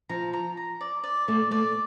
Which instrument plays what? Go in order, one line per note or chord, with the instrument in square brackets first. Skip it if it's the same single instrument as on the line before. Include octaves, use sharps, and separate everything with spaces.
[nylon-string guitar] F3 [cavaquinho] A#5
[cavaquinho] A#5
A#5
D5
D5
[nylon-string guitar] A3 [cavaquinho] D5
[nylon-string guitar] A3 [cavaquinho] D5